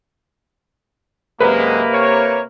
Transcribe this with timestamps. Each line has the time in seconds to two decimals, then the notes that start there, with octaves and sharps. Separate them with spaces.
1.40 F#2 C3 G#3 A#3 B4
1.93 C#5